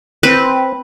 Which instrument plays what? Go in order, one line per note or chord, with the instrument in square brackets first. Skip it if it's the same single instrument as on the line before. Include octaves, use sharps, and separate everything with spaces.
[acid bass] C4 [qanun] B4